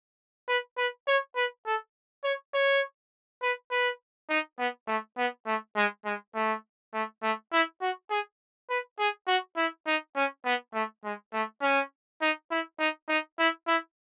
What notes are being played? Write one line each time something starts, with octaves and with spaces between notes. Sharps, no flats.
B4
B4
C#5
B4
A4
C#5
C#5
B4
B4
D#4
B3
A3
B3
A3
G#3
G#3
A3
A3
A3
E4
F#4
G#4
B4
G#4
F#4
E4
D#4
C#4
B3
A3
G#3
A3
C#4
D#4
E4
D#4
D#4
E4
E4